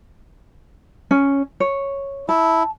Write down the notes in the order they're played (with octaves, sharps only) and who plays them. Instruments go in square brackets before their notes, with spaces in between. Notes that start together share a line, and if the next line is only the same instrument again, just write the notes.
[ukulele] C#4
C#5
[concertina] E4 [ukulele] A5